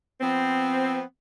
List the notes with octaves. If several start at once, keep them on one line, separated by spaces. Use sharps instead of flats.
F3 B3 C4